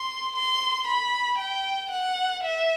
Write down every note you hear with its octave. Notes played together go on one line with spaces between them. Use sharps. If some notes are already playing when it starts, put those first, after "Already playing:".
Already playing: C6
C6
B5
G5
F#5
E5